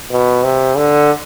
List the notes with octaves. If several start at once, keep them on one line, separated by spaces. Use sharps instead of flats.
B2
C3
D3